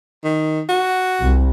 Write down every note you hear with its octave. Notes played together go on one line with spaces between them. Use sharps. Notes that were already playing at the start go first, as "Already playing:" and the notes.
D#3
F#4
C2